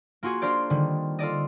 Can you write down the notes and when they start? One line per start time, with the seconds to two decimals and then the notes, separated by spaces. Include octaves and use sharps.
0.23 A#3 F4 F#4 G#4
0.42 D4 F4 A#4 C5 D5
0.70 D3 D#3 G3
1.19 F4 A4 D5 D#5